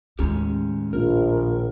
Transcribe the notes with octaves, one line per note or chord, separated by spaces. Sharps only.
D#2 A2 G#3 C#4 G4
A#1 A#4